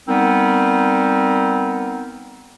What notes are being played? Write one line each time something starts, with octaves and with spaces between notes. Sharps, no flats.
G3 B3 C4 D#4 A#4